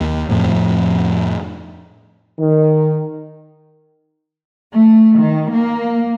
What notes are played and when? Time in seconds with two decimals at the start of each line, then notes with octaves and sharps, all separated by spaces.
0.01 D#2
0.29 F2 A2 F3
2.39 D#3
4.73 A3
5.19 D#3
5.51 A#3